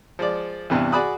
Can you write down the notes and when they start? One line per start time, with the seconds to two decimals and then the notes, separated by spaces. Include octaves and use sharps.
0.19 F3 G#3 D5
0.70 E2 G2 C3 E3
0.92 F#4 G#4 D5 B5 D#6 F#6